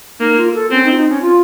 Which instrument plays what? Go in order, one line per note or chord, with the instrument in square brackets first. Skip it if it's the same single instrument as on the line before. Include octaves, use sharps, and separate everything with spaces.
[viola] A#3 [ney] D#4
[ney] F4
A#4
A4
[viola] C4 [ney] C#4
[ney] D#4
F4
D#4
C#4
F4